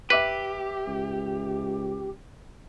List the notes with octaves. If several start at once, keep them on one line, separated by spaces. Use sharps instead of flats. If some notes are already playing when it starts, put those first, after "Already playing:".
G4 B4 E5 D6 B6
C#2